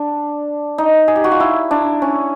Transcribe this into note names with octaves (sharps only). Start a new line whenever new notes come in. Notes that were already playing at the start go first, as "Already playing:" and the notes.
Already playing: D4
D#4
G#4
G4
F#4
F4
E4
D4
C#4